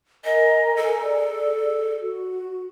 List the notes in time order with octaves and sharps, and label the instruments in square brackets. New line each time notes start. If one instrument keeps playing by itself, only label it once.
[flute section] A#4 G#5 A#5 [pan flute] D#5
[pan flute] A4
[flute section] G#4 D5
F#4